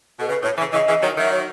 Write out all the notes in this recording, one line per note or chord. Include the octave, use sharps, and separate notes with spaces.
B2 A4
C#3 B4
A2 C#5
C#3 E3
C#3 E3 D#5
C#3 E3
D#3 F#3
D#3 F#3 E5
C#5